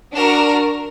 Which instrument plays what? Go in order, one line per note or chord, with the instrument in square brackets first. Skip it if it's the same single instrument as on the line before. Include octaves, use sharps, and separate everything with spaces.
[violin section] D4 F#4 A#4